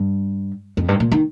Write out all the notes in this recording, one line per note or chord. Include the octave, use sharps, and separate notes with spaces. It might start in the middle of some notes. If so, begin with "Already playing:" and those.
Already playing: G2
F2
G2
A#2
D#3